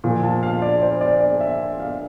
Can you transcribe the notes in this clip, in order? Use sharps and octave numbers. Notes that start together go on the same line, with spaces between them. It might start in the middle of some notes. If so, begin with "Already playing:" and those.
A#2 F3
A5
F5
D5
C5
D5
D5
E5
F5